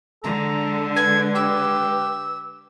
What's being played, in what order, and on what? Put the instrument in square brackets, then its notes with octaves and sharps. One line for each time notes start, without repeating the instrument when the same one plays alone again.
[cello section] D3 G#3 [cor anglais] A4 [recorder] A#5
[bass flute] B4 [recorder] G#6
[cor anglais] G4 [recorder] E6